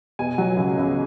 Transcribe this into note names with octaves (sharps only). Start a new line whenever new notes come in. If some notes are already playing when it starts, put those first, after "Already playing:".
B2 G#5
F#3
C#2
C#2